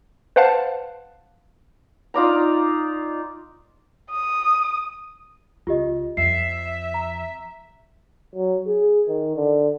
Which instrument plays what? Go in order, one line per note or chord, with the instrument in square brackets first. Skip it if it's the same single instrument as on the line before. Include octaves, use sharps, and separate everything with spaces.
[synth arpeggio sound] B4 C5 F5 F#5 A5
[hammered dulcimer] D#4 F4 D5 A#5
[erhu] D#6
[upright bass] C#2 [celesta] F4 G4 D#5
[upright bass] F2 [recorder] E5 [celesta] C7
[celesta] A#5
[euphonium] F#3
G#4
D#3
D3